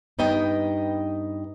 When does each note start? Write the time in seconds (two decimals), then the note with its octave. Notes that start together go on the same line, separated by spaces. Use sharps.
0.19 G2 B3 D#4 D#5 G5